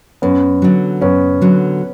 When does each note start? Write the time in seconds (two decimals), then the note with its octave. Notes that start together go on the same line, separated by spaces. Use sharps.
0.22 F#2 B3 C#4
0.62 D3 F#3
1.01 F#2 B3 C#4
1.41 D3 F#3